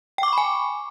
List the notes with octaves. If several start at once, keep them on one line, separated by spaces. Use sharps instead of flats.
G5 G#5 B5 C#6 D6